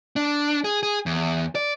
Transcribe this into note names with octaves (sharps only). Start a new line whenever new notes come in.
D4
G#4
G#4
E2
D5